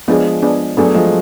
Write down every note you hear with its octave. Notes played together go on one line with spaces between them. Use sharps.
F3 G#3 B3 D4 G#4
B3 D4 G#4
F#3 A3 B3 D4 G#4
F3 G#3